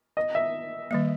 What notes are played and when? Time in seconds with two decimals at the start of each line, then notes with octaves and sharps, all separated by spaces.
0.17 D#5
0.35 E5
0.91 D#3 G3 A#3